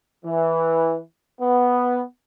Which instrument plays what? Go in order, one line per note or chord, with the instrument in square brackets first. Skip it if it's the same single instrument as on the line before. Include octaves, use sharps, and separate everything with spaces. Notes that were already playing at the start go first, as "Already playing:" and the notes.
[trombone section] E3
B3